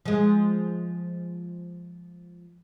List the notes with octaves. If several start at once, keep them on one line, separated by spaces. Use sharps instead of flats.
F3 G#3